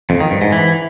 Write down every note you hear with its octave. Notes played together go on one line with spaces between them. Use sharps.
F2
D#3
G2
G#2
E3